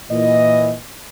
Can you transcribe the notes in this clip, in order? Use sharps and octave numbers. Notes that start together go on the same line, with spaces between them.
A#2 E3 D#5